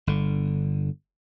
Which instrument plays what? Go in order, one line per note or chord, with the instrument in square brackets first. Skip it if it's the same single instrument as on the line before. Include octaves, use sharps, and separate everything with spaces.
[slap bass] G1 D3